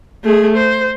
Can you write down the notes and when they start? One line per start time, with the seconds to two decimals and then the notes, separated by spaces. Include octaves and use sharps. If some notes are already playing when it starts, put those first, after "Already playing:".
0.24 A3 G#4
0.57 C5